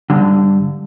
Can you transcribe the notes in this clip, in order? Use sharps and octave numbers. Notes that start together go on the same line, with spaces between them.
G2 D3